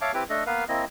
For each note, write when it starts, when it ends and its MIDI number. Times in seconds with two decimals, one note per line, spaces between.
0.01 0.12 73
0.01 0.12 76
0.01 0.12 77
0.01 0.12 81
0.01 0.12 86
0.14 0.24 60
0.14 0.24 64
0.14 0.24 67
0.14 0.24 71
0.14 0.24 86
0.29 0.44 57
0.29 0.44 62
0.29 0.44 69
0.29 0.44 75
0.46 0.64 58
0.46 0.64 59
0.46 0.64 71
0.46 0.64 77
0.69 0.85 58
0.69 0.85 60
0.69 0.85 64
0.69 0.85 75